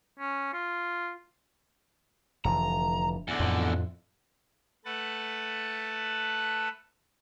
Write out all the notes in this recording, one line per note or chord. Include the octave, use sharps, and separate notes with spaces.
C#4
F4
F1 D3 E3 A#5
E2 D3
F2 A2 F3
A3 B4 F#5 A5